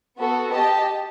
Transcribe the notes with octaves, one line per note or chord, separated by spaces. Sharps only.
B3 F#4 A4
G4 D#5 A5